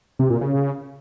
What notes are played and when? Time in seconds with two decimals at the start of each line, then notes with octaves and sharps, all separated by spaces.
0.19 C3
0.30 A#2
0.41 C#3